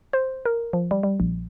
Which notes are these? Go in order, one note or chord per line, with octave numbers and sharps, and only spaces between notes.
C5
A#4
F3
G3
G3
A#1